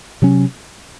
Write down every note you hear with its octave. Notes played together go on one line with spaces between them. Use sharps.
C3 F#3 C#4